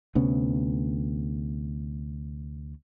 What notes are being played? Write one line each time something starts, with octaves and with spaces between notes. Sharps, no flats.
D2 C3 B3 C#4